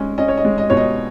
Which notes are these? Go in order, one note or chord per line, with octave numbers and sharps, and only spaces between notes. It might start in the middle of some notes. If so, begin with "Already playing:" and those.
Already playing: G#3 C#4
C#4 D#5
C#5
D#5
G#3
D#5
B2 C#5
D#5